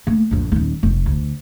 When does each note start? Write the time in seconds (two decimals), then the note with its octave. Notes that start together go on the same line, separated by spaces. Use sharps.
0.07 A3 A#3
0.31 A#1 F2
0.52 D#1 D#2
0.83 F1
1.06 D2